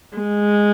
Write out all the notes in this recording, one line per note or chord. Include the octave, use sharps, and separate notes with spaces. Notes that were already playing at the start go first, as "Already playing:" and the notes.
G#3